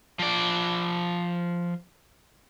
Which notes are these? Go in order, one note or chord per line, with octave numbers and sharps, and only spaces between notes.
F3 D5